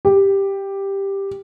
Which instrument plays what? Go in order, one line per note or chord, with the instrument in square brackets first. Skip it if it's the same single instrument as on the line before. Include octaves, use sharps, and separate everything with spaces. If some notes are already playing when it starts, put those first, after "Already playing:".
[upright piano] G4